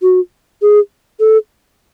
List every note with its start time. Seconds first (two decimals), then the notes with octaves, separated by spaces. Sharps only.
0.02 F#4
0.62 G#4
1.20 A4